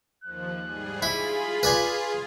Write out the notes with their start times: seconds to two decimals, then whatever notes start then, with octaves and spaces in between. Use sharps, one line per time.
0.24 D#2 F3 F#6
0.64 G#2 G3 G#4
1.02 E4 F4 G#4 B5
1.63 B4 D5 G#5